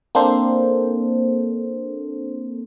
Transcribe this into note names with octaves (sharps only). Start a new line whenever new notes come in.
A#3 C4 D4 A4 C5